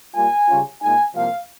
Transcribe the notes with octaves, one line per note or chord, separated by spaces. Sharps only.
A#2 G3 A#3 F4 G#5
C#3 G3 C#4 F4
A#2 G#3 D#4 G#5
C2 C3 F3 A#3 F5